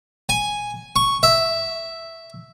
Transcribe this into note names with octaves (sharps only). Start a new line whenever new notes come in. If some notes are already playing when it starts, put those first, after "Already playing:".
G#5
C#6
E5